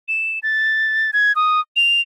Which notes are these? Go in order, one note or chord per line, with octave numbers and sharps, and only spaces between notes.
E7
A6
G#6
D#6
F7